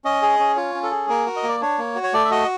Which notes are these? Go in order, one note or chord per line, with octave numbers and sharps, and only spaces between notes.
C#4 D#5
G#4
C#4
F4 C#5
C#4
A4
G#4
A#3 A#4
F#4
D#5
A#3
D5
D4 C#5
A#3
F#4
C#5
A3 D5
E5
F#4 D#5